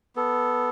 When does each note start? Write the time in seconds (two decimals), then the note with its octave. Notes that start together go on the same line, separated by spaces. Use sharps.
0.16 B3 A4